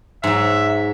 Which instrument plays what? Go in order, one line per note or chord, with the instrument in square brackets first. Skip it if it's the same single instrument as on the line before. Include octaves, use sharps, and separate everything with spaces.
[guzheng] G#2 F#3 [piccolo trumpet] E5